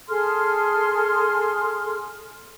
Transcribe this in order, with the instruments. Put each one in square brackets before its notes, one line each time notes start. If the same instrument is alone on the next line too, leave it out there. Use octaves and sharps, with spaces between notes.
[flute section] G#4 A4 C6 F6